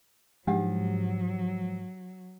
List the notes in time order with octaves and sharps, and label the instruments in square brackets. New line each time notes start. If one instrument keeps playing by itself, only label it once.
[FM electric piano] G#2 [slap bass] F3 [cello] F#3 [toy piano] D4 G4 F#5